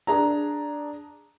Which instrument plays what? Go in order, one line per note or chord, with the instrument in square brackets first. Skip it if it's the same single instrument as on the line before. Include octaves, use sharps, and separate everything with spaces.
[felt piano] D4 G#4 A#5